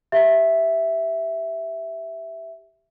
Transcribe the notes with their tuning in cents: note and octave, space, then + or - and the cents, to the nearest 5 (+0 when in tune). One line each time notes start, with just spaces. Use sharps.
G4 +0 E5 +0